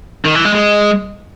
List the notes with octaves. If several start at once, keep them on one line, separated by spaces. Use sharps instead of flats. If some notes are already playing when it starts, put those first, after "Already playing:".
D#3
E3
G#3
G#3